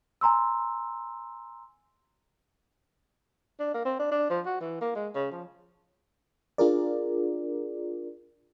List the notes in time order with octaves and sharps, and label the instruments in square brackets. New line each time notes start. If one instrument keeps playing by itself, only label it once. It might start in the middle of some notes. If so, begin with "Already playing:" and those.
[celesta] G#5 A#5 C6 E6
[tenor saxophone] D4
A#3
C4
D4
D4
F3
F#4
E3
A#3
G#3
C#3
F3
[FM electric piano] D4 F4 G#4 A#4 D5